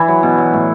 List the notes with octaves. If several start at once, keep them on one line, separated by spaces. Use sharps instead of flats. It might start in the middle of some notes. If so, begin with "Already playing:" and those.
Already playing: E3 D4 E4
F#3
B2
F#3
A2